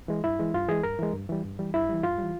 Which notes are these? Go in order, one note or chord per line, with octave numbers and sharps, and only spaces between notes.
E3 G#3
G2 E4
E3 G#3
G2 F4
E3 G#3 G#4
G2 A#4
E3 G#3
G2
E3 G3
G2
E3 G3
G2 E4
E3 G3
G2 F4
E3 G3